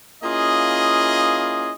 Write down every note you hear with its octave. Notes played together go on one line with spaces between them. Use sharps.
A#3 C#4 E4 F4 G#4 D#5